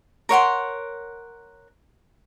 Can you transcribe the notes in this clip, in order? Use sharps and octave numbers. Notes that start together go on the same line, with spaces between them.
A#4 C#5 F#5 C6